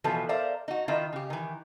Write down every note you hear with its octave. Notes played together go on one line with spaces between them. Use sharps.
B2 E3 F3 A4 B4
A#4 C5 D5 E5 F5
D#4 F#4
D#3 E4 F4 D#5 E5
C#3 G4
D#3 E3